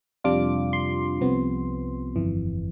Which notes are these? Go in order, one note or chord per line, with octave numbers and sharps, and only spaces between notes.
F2 C3 G3 D4 F4 D6
C6
C2 C3 F3 B3
G1 F2 E3